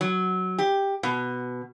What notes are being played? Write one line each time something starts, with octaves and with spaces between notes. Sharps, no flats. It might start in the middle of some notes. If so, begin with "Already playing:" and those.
F#3
G4
B2